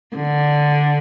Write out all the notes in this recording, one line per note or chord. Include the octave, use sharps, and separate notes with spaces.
D3